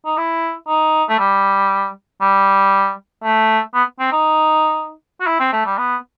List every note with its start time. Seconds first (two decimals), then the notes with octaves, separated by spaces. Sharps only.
0.06 D#4
0.18 E4
0.68 D#4
1.09 A3
1.19 G3
2.21 G3
3.24 A3
3.74 B3
4.00 C4
4.12 D#4
5.21 F#4
5.27 E4
5.40 C4
5.53 A3
5.66 G3
5.78 B3